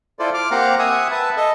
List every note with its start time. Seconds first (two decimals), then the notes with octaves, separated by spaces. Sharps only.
0.19 E4 F4 A4 C5 D5
0.34 D6 F6
0.51 A#3 C4 G4 F5 F#5 A#5
0.79 E5 F#5 G#5 D#6
1.11 B4 E5 A5
1.37 A4 D#5